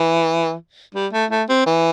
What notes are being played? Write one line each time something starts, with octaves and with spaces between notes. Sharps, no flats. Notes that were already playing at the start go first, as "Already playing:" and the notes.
Already playing: E3
G3
A3
A3
C4
E3